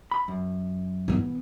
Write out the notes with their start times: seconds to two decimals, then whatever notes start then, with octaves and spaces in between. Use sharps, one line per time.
0.11 B5
0.28 F#2
1.08 E3 B3